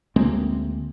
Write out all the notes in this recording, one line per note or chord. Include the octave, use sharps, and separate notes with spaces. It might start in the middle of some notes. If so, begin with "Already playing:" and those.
D2 G#3 A#3 C4